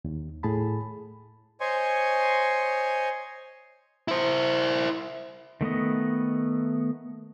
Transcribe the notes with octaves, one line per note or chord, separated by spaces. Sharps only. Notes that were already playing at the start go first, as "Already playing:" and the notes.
D#2
A2 G#4 A5 B5
C5 C#5 D#5 G#5 C6 C#6
E4 C5
D#3 A3 B3 D#5